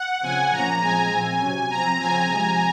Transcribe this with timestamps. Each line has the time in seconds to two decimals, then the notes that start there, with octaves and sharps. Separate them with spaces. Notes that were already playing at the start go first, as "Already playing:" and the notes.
Already playing: F#5
0.23 C#3 F3 C4 G#5
0.52 A#2 F3 A#3 C#4 A#5
0.81 A#2 F3 G#3 C4 G#5
1.12 A#2 F3 C4
1.41 C3 F#3 C#4
1.70 F3 C4 A#5
1.99 C#3 F3 C4 G#5
2.29 C3 F3 G#3